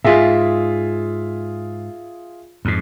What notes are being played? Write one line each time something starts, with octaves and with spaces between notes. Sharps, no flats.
G#2 F4 G#4 E5
F2 G#2